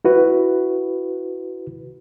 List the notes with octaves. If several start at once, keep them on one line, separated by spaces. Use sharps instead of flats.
E4 F#4 B4